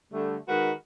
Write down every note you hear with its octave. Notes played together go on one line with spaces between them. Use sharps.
D3 G3 A3
D#3 G#3 F#4 A#4 B4